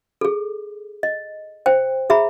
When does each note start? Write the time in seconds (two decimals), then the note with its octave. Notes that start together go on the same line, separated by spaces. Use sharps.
0.21 G#4 A4
1.03 D#5
1.66 C5 G5
2.10 G#4 E5 A#5 B5